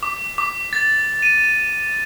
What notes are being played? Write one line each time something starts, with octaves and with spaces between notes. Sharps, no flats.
D6
D6
A6
D#7